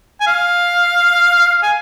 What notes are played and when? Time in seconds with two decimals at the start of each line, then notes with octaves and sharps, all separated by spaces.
0.21 G#5
0.27 F5
1.63 G#5